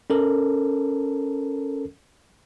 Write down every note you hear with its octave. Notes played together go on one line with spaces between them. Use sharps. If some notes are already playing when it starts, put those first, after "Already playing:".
C#4 A4 A#4